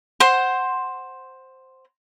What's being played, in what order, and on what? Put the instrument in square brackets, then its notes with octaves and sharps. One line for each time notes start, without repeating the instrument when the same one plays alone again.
[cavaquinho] C5 F#5 C6